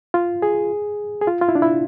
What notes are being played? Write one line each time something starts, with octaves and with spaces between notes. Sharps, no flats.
F4
G#4
G#4
F4
F4
E4
D4
E4